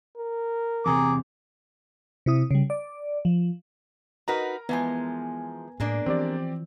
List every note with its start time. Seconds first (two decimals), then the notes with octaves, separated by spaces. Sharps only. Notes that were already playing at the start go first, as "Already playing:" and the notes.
0.18 A#4
0.86 E2 C3 G#4 A#5 D6
2.26 C3 E4 D#6
2.51 C#3 G3
2.70 D5
3.25 F3
4.28 D#4 F#4 A#4 B4 A#5
4.69 E3 F3 G#3 B3 G#5
5.80 A2 G#3 A#3 D4
6.06 E3 F3 C4 G4 D5